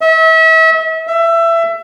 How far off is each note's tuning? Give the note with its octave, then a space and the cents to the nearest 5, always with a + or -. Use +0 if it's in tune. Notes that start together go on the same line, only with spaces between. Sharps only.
E5 -35
E5 +20